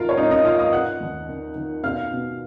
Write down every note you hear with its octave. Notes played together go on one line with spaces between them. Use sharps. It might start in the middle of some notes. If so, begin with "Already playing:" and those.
Already playing: G#1 G#2 F4 A#4 F5
C#5
G#2 D#4 D#5
D#4 D#5
G#2 F4 F5
D#5 D#6
D#4 F#5 F#6
D#2
D#3
D#3
B2 F5 F6
B2